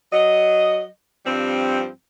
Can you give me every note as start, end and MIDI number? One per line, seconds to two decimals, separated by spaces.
0.13 0.86 54
0.13 0.86 75
1.26 1.88 43
1.26 1.88 53
1.26 1.88 55
1.26 1.88 60